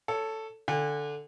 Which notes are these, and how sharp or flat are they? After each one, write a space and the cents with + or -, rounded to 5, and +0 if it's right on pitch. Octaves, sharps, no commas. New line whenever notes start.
A4 +5 C#5 +15
D3 +0 G#5 -35